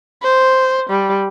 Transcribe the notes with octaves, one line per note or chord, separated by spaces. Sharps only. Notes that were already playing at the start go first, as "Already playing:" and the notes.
C5
G3